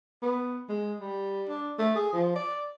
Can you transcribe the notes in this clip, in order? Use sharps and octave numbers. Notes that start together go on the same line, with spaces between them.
B3
G#3
G3
D4
A3
G#4
F3
D5